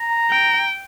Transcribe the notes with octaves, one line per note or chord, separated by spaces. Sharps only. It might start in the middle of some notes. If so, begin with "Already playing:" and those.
Already playing: A#5
G5